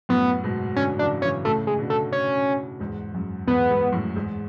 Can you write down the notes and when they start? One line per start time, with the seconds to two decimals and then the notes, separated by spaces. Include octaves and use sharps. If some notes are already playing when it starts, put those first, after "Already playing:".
0.09 F#2 A2 B3
0.44 G#2 B2
0.76 B2 D3 C#4
0.99 C#3 E3 D4
1.22 C#3 E3 C#4
1.45 A2 C#3 A3
1.67 G#3
1.78 B2 D3
1.90 A3
2.12 C#4
2.80 E2 G#2
3.15 F#2
3.47 E2 G#2 B3
3.70 E2 G#2
3.92 F#2 A2
4.16 E2 G#2